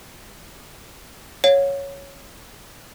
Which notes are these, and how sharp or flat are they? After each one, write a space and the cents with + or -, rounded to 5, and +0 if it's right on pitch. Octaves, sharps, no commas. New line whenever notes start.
C#5 +0 F5 +40